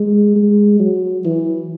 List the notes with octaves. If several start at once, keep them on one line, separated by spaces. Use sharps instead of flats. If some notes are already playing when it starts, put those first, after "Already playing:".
Already playing: G#3
G#3
F#3
E3